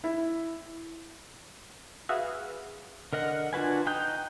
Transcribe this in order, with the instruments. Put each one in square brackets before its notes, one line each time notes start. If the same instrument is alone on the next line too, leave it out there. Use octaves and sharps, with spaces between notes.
[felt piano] E4
[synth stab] F#4 G#4 B4 E5 F5
[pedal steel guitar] D3 A#4 D#5 F#5
D4 F4 F#4 B4 G#5
D#4 G5 D#6 F#6 G6